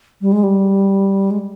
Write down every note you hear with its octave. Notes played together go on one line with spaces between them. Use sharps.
G3
G#3
G3
G#3